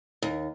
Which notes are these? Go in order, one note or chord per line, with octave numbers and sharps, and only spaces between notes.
D#2